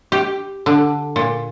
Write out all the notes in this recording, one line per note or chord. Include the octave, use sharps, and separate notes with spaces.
G4
D3
A#2